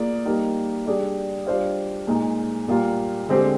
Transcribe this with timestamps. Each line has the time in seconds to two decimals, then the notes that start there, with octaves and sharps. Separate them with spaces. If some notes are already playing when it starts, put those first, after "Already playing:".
Already playing: A#3 F4 G#4 D5
0.25 G3 A#3 D#4 A#4
0.86 G3 D4 G#4 D5
1.46 G3 D4 F4 C5 F5
2.07 A#2 G#3 D#4
2.68 A#2 G3 A#3 F4
3.29 D3 G#3 C4 G4 C5